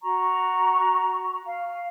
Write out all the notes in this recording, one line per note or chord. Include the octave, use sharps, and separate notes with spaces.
F#4 A#5 C#6
F5